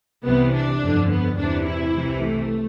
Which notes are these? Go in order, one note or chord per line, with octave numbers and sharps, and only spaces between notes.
C2 C3 E3 B3
D4
G1 F2 D3
B3
E2 C3 E3 D4
E4
C2 C3 E3
A3